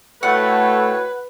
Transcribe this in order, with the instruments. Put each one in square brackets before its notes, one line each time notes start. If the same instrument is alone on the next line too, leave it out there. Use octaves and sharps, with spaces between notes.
[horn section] A2 F#4 C#5 [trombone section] A3 [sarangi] B4 [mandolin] F#5